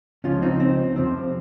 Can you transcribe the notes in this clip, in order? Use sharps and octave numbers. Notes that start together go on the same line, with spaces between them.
C#2 C#3 F3 C#4 F4
C4 D#4
C4
F2 C3 F3 C4